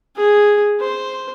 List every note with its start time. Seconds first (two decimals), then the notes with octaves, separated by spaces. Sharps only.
0.16 G#4
0.80 C5